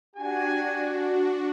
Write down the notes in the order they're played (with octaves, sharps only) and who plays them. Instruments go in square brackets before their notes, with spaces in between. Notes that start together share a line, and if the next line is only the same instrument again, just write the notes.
[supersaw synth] D4 F#4 [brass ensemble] G4 G#5